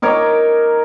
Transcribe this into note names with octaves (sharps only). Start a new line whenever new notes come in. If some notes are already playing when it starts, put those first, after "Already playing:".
D#4 A#4 C#5 D6